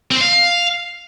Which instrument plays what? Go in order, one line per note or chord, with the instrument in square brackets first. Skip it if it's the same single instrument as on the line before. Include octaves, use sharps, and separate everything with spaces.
[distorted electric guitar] C4
C5
F5